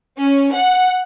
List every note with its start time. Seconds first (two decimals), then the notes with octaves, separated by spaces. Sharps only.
0.19 C#4
0.53 F#5